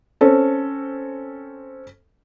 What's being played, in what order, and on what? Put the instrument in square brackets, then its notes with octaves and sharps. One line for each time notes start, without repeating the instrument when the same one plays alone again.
[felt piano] C4 C#4 A4